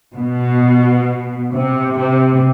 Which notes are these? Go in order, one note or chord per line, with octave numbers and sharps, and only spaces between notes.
B2
C3
C3